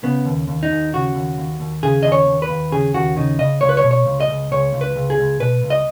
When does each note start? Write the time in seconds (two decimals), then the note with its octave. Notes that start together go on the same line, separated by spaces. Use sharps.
0.03 C#3 B3
0.25 D#2
0.48 D#2
0.63 D#4
0.70 D#2
0.93 C#3 F#4
1.15 D#2
1.37 D#2
1.60 D#2
1.83 C#3 G#4
2.03 D#2 D#5
2.12 C#5
2.26 D#2
2.42 B4
2.49 D#2
2.72 C#3 G#4
2.94 D#2 F#4
3.16 C#3 D#4
3.38 C#3 D#5
3.61 C#2 C#5
3.69 B4
3.77 C#5
3.83 B2
3.91 C#5
4.06 C#2
4.20 D#5
4.28 C#2
4.51 C#2 C#5
4.73 C#2
4.81 B4
4.96 C#2
5.10 G#4
5.18 C#2
5.40 B2 B4
5.63 C#2
5.70 D#5